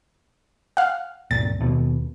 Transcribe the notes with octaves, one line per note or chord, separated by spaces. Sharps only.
F5 F#5
G1 C#2 A#2 A6
D#2 B2